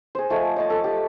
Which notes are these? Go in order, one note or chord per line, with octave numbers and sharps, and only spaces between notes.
G#4 C5
F3 A3 D#5 G#5
C#5 D#5 A5
A4
G4